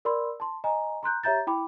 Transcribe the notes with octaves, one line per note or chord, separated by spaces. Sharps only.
A#4 D5 B5 C6 E6
A5 C6
D#5 G#5 A#5
A#5 C6 F#6 G6
G4 C#5 E5 A#5 G6 A6
E4 G5 B5 D6